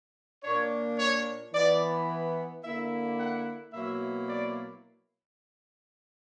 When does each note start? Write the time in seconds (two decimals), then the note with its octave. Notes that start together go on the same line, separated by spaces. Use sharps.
0.44 A#2 A#3 D4 C#5
0.98 C#5
1.53 E3 B3 E4 D5
2.63 D3 A#3 E4 E5
3.18 F#5
3.73 B2 F#3 A#3 E4 E5
4.27 D5